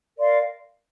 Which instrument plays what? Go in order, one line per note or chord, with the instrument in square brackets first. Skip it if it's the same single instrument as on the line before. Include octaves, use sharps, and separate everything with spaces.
[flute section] A#4 D5 F5 C6